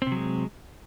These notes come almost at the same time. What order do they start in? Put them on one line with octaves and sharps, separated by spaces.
C4 C3 F#3 G#3